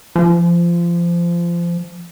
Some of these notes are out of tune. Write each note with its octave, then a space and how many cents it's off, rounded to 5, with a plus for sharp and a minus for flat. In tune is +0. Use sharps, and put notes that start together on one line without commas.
F3 -25